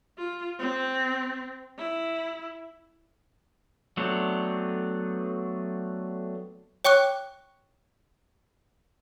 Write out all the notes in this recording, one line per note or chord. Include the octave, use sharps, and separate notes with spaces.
F4
C4
E4
F#3 A3 B3 C4 D4
C#5 G5 C#6 D6 F#6